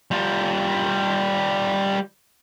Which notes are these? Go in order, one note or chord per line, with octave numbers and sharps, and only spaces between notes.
G3 F4